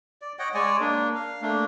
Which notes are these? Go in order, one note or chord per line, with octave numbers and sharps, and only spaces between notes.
D5
C#5 D#5 F#5 G5
G#3 C#5 D5 G#5
A#3 D4
F5
A3 A#3 D4